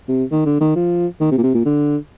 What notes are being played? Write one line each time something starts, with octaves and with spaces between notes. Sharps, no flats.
C3
D#3
D3
D#3
F3
D#3
C3
A#2
C3
A#2
D3